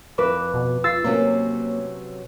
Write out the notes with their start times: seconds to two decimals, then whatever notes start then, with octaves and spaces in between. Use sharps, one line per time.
0.18 F2 B4 D6 E7
0.54 B2
0.84 F4 E6 A6 C7
1.04 C3 F#3 A#3 C#4